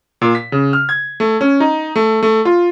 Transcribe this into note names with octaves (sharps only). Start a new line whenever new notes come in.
A#2
B6
C#3
F6
G#6
A3
C#4
D#4
A3
A3
F4